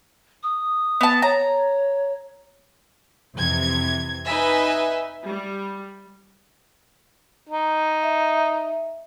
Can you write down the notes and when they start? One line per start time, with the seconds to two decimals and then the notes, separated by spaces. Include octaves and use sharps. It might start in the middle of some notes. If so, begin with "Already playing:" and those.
0.43 D#6
1.01 B3 A5
1.22 C#5 A#5
3.36 F2 C3 E3 G#6
4.28 D#4 B4 D#5 E5 G#5
5.27 G3
7.49 D#4
8.03 E5